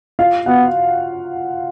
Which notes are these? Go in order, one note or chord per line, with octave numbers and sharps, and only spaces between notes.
F4 F5
B3 F#4 F#5